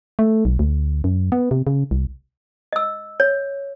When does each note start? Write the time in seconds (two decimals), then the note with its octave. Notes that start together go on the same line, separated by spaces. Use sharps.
0.19 A3
0.45 B1
0.59 D2
1.04 F#2
1.32 B3
1.51 C3
1.67 C#3
1.91 C2
2.73 D#5 E6
3.20 C#5